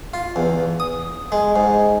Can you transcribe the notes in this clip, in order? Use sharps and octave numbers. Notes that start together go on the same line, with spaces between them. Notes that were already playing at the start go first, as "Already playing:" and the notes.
F4
E2
D#6
G#3
G#2